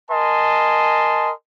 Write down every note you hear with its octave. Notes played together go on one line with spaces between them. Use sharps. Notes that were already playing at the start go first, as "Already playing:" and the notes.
A#4 D#5 G#5 A5 C6